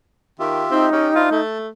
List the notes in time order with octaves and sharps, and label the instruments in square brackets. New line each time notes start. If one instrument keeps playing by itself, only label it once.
[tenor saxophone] D#3 [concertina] F4 G4 E5
[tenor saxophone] C4 [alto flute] D#4
[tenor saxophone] C#4 [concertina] G4 G5
[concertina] D4 E4 C5 [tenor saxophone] F4
[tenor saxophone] A3 [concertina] A5